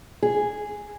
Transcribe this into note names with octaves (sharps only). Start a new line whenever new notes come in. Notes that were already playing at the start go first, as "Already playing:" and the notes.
G#4